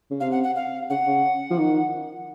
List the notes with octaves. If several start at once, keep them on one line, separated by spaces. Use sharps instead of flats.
C#3
C3 F5
F#5
F#5
F5
C#3 F#5
C#3
F3
D#3